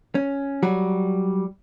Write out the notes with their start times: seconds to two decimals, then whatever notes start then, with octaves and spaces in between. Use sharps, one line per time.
0.15 C#4
0.63 F#3 G3 F#4